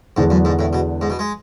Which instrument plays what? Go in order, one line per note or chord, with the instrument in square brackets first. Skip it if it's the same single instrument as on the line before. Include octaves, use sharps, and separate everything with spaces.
[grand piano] E2 D3 G#3 D4 [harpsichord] G#2
[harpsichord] F#2
G#2
A2
B2
G#2
B2
G#3